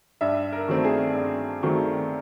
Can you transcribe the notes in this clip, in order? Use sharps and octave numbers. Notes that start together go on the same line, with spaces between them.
G2 E5
A#4
D#3 F#3 A3 C4
G#4
G2
D#3 F#3 A3 C4